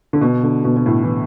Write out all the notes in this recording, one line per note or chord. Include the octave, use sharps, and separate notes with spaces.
D3
B2
D3
B2
B2
A2
E3